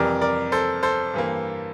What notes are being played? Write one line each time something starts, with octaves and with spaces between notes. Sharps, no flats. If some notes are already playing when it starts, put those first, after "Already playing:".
Already playing: F2 C3 E3 G3 A#4 D5
A#4 D5
A4 C5
A4 C5
G2 E3 A#3